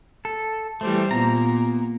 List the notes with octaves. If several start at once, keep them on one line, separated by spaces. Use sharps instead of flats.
A4
E3 G3 A3 C5
A#2 A#3 B3 A#5